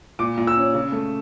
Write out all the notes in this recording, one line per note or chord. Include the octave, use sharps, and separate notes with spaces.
A#2 D6
A#2
E6
C#4
C#3
A3